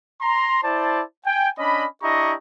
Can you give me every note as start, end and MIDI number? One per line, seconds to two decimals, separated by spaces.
0.21 0.59 82
0.21 0.59 84
0.63 1.02 64
0.63 1.02 72
0.63 1.02 74
0.63 1.02 81
1.26 1.49 79
1.26 1.49 80
1.58 1.86 61
1.58 1.86 62
1.58 1.86 75
1.58 1.86 83
2.03 2.34 62
2.03 2.34 64
2.03 2.34 67
2.03 2.34 75
2.03 2.34 82
2.03 2.34 85